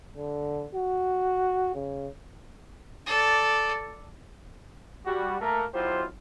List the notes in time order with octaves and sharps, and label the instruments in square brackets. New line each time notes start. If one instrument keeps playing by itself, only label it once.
[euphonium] D3
F#4
C#3
[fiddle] A4 D5
[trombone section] G3 F#4
A3 A#3 A#4
B1 F#3 E4 F4 G4 C5